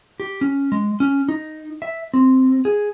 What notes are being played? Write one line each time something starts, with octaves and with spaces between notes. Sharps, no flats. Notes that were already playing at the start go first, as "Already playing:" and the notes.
G4
C#4
G#3
C#4
D#4
E5
C4
G#4